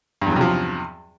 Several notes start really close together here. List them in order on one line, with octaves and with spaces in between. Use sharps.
G2 E2 F#3 C3 F3